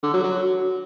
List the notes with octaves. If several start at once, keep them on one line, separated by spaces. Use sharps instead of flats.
D3
F#3
F#3